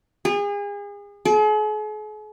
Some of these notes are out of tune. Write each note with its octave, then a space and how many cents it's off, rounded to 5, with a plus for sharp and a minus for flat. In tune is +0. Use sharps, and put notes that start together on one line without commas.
G#4 -35
G#4 +45